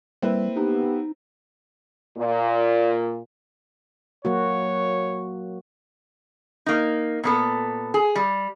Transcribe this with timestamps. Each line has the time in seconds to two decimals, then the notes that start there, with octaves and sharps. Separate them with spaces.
0.22 G3 A#3 C4 E4 B4
0.57 B3 D#4 G4
2.17 A#2
4.25 F#3 A#3 F#4 C#5
6.66 A#3 D#4
7.23 A#2 B3 A4
7.94 G#4
8.16 G3